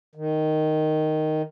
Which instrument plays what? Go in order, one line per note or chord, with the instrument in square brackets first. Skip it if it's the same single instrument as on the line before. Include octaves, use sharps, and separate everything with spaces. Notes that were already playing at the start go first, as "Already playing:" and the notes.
[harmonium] D#3